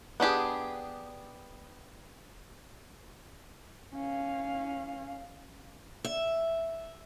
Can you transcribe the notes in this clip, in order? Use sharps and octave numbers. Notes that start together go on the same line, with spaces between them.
B3 D4 G4 G#4
C#4 F5
E5